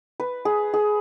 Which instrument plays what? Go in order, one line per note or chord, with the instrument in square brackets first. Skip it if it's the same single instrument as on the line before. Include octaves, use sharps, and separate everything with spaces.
[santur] B4
G#4
G#4